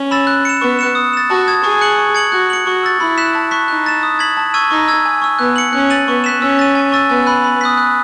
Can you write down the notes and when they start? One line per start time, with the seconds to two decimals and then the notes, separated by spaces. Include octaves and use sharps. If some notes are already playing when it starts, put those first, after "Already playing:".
Already playing: C#4
0.11 B5 E6 A6 E7
0.27 F#6
0.45 C#7 E7
0.61 B3 C#6
0.79 F#6 C#7 E7
0.95 D#6
1.13 A6 E7
1.29 F#4 A5
1.48 D#6 G#6
1.63 G#4 C#6
1.81 F#6 C#7 F#7
1.98 C#6
2.15 G#6 C#7 F#7
2.32 F#4 F#6
2.50 C#7 F#7
2.66 F#4 C#6
2.83 E6 A6
3.00 E4 B5
3.18 F#6 B6 E7
3.35 A5
3.51 C#6 F#6 B6
3.68 D#4 F#6
3.86 A6 E7
4.03 D#6
4.19 G#6 B6 F#7
4.37 A5
4.54 C#6 E6 G#6 D#7
4.70 D#4 C#6
4.88 E6 G#6
5.05 G#5
5.22 C#6 E6
5.39 B3 F#6
5.56 C#7 F#7
5.73 C#4 F#6
5.90 A6 D#7 F#7
6.07 B3 C#6
6.24 F#6 B6 E7
6.41 C#4 E6
6.59 A6 D#7
6.75 G#5
6.92 C#6 E6 A6 D#7
7.10 B3 G#5
7.27 B5 F#6
7.44 B5
7.61 D#6 F#6 B6
7.77 F#6